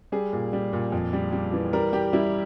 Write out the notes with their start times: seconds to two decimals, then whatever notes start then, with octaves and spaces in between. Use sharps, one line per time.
0.12 G3 G#4
0.33 A#2
0.53 G3
0.73 A#2
0.92 F2
1.13 G3
1.32 G3
1.53 E3
1.73 G3 A#4
1.93 G3 G4
2.13 G3 E4